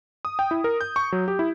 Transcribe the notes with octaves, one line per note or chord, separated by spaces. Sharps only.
D#6
G5
E4
A#4
G6
C#6
F#3
G4
E4